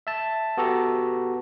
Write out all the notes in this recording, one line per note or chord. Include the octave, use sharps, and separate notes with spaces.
E5 A5
B3 F#4 G4 A4 A#5